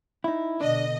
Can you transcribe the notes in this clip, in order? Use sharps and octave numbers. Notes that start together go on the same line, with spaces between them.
D#4 E4
B2 D3 D4 D#5